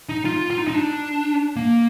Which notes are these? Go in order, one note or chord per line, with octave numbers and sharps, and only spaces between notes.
D#4
F4
F4
D#4
D#4
D4
A#3